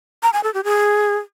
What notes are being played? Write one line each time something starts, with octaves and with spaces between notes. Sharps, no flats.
A#5
G#5
A4
G4
G#4